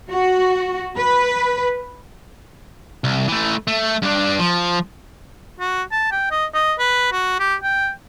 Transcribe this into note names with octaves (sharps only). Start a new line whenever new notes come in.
F#4
B4
C2
E3 A3
A3
G2 D4
F3
F#4
A5
G5
D#5
D#5
B4
F#4
G4
G5